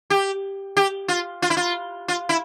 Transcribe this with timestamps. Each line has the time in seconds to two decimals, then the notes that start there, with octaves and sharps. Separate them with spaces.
0.10 G4
0.77 G4
1.08 F4
1.42 F4
1.50 E4
1.57 F4
2.08 F4
2.29 E4